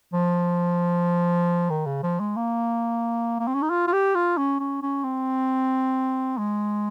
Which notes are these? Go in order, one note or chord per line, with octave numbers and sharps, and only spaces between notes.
F3
D#3
C#3
F3
G#3
A#3
A#3
C4
C#4
D#4
F4
F4
G4
F4
C#4
C#4
C#4
C4
G#3